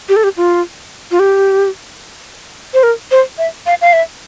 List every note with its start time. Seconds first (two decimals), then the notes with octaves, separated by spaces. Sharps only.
0.09 G4
0.16 A4
0.24 G4
0.37 F4
1.11 F4
1.19 G4
2.74 C5
2.83 A#4
3.11 C5
3.38 E5
3.66 F5
3.81 F5
3.93 E5